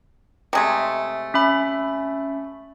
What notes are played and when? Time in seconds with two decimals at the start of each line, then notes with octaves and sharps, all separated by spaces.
0.53 C3 G#3 A3
1.34 C#4 E5 B5